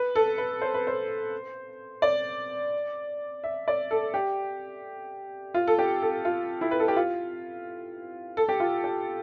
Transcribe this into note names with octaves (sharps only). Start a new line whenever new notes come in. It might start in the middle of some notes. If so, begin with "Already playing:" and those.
Already playing: B4
A4
B4
C5
B4
C5
D5
E5
D5
A4
G4
F4
A4
G4
A4
F4
E4
B4
A4
G4
F4
A4
G4
F4
G4